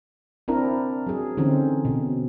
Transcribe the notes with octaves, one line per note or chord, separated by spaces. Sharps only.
C4 D4 E4 A#4
F#3 G#4
D3 E3 C4 C#4 D#4
B2